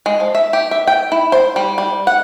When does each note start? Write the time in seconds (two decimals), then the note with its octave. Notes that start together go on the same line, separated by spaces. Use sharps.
0.06 G#3
0.20 F3
0.35 E5
0.53 G4
0.71 E5
0.87 G5
1.12 E4
1.32 C5
1.56 G3
1.78 G3
2.07 F#5